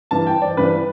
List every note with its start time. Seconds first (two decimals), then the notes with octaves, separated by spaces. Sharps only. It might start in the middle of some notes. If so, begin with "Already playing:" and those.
0.11 G2 E3 A5
0.27 G5
0.42 D5
0.57 G2 E3 B4